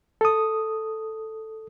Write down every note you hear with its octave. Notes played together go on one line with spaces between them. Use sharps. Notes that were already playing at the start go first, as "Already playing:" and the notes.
A4 D#6